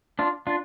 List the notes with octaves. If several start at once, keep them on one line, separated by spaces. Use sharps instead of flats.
D4 F4
D4 F4